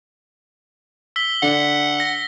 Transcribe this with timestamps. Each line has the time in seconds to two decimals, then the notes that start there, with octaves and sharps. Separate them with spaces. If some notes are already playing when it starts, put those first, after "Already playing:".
1.16 E6 B6 G7
1.42 D3 D4 F#5
2.00 A#6